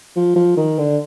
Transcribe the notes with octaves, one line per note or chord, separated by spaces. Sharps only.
F3
F3
D#3
D3